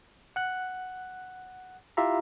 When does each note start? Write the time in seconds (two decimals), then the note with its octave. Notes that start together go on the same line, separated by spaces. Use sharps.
0.36 F#5 F#6
1.97 E4 F4 G4 E5 F5 A#5